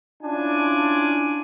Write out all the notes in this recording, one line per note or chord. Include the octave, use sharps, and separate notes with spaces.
C#4 D4 E4 F4 D5 G#5